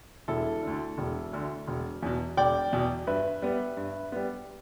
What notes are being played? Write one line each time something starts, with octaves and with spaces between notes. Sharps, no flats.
E1 E4 A4
D2 D3
E1
D2 D3
E1
E2 B2
E1 D5 G5
E2 B2
G2 B4 E5
G3 B3
G2
G3 B3